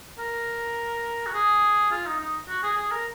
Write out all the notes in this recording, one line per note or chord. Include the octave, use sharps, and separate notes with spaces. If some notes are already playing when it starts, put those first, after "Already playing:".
A#4
F#4
G#4
F4
D#4
D#4
F#4
G#4
G#4
A#4